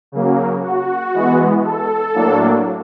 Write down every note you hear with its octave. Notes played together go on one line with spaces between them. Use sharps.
C#3 F#3 A#3
F#4
E3 G#3 B3
A4
A2 F#3 A#3 D4